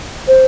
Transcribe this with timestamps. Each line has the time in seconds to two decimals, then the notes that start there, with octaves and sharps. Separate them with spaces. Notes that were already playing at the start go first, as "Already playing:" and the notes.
0.28 C5